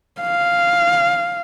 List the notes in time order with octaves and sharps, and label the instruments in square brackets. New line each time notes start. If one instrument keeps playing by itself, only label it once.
[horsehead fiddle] F5